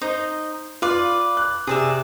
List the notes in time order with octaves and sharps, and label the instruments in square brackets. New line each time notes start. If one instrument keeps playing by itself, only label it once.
[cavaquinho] D#4 D#5 [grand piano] C5
[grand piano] F4 [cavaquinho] B4 D5
[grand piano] F#6
[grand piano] C3 [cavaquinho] G#4 D5 E5